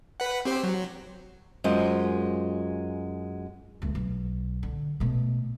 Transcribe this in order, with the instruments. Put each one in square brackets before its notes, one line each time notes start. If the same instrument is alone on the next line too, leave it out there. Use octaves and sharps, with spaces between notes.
[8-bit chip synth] B4 F#5
C4 G4 C5
F#3
[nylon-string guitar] F#2 G#3 F4 G#4 C5
[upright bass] C#2 A3
B1
D3
B2 A3